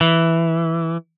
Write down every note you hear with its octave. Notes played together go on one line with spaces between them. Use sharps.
E3